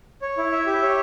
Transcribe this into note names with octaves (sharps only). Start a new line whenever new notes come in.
C#5
E4
E5
G4
C#5